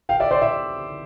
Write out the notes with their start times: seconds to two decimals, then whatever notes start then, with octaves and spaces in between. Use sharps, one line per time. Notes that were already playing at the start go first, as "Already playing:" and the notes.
0.09 F5 G5
0.20 D5 E5
0.31 C5 D5
0.42 D5 E5